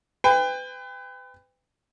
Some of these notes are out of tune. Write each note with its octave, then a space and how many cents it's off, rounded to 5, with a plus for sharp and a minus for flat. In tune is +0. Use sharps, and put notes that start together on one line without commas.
B4 +35 G5 +30